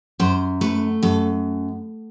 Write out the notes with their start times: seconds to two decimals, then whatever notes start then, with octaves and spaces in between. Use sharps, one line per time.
0.20 F#2 C5
0.61 A3 B4
1.03 F#2 A4